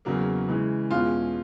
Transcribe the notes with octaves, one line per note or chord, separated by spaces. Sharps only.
E2 C#3 F#3 A#3
C#3 E3 G#3
E2 B2 G#3 C#4 F4